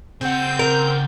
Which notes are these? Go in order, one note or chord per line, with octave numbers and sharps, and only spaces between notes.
C#3 C4 F#5 G6
A#4